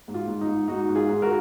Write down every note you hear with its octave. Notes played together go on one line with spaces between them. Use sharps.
G#2
F4
G#2
D#4
G#2
G#2 D#4 F#4
G#2
F4 G#4
G#2
F#4 A#4